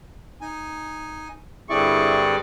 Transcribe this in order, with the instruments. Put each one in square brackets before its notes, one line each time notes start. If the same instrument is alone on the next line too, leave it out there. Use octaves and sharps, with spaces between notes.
[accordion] D#4 G#5
[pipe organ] G2 D5 [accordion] D3 C4 G#4 [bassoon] E4 [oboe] C#6